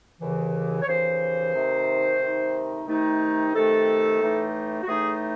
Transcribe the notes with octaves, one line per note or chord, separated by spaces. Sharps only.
D#2 C#3 E3
C#5
D#2 C#3 E3 C5
C3 D#3 A3 D#4
C3 D#3 A3 D#4
C3 D#3 A3 D#4
C3 D#3 A3 D#4 A4
A2 E3 A3 D#4
F#4
A2 E3 A3 D#4 G#4